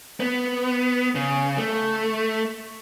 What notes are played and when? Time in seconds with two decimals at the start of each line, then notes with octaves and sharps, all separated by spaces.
0.20 B3
1.15 C#3
1.58 A3